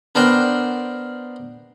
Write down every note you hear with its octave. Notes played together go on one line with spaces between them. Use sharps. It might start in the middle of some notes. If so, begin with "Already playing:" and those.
B3 D4 A#4 C5 D5 G5